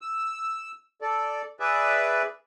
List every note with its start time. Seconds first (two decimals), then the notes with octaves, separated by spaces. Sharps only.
0.02 E6
1.01 A4 D5
1.60 G#4 B4 D5 E5